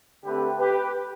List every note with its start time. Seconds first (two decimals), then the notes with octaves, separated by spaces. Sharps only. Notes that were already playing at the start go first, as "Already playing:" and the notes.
0.24 D3 A3 C4 G4 B4
0.59 G4 B4